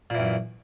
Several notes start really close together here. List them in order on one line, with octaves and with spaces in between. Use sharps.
A#2 E3 F#2